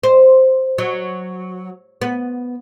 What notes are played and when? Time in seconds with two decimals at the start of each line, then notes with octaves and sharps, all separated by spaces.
0.03 C5
0.78 F#3
2.01 B3